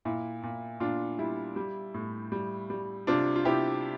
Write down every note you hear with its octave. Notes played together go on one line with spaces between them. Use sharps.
A#2 E4
A#2
A#2 D4 F4
G3 E4
G3
A2
G3
G3
C3 D4 F4
F4
C3 E4 G4